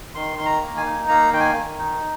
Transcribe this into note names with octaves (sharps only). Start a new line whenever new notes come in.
D#3 C6
D#3 C6
A#5
A#3
G#5
D#4
A#3 A#5
D#3 G5
G#5
D#3
D#4